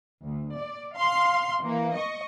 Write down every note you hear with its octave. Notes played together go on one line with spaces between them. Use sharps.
D2
D5
F5 C6
E3 A#3
D#5 C#6